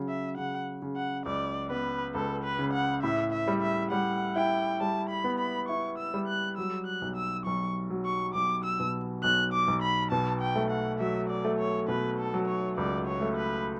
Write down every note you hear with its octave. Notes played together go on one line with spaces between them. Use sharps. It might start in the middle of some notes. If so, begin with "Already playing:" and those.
Already playing: C#3 F#3
E5
C#3 F#5
C#3
F#5
C#2 D5
B3 B4
C#2 A4
B4
C#3
F#5
A2 E5
E5
G3
E5
G3 F#5
E4 G5
G3 A5
B5
B3
B5
E4 C#6
E6
G3
F#6
F#3 E6
F#6
B1
E6
B1 C#6
F#3
C#6
B1 D6
E6
B2
B1 F#6
D6
B1
B5
B2 A5
G5
A3
F#5
F#3 E5
D5
A3
C#5
B2 B4
A4
F#3
C#5
C#2 D5
C#5
A3
B4